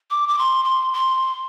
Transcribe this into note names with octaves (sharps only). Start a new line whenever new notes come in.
D6
D6
C6
C6
C6